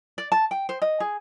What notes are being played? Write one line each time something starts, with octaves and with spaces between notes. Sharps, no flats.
D5
A5
G5
C5
D#5
G#4